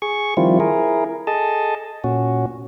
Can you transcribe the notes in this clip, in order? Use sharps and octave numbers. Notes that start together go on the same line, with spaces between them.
G#4 C#6
D#3 F3 G3 C4 E4 F4
E4 G#4 A#4
G#4 A4 D#5 A5
A#2 C#4 F#4